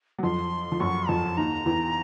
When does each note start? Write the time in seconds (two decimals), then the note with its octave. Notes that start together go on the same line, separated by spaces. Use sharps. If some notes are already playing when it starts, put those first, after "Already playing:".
0.18 F#3
0.23 F2 F3 C6
0.72 F3
0.80 F#2 F#3 C#6
1.09 F2 F3 A5
1.37 D#2 D#3 A#5
1.66 E2 E3